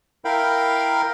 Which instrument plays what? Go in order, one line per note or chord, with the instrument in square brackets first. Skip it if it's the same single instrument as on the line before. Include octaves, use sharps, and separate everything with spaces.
[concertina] E4 A#4 F5 G5 B5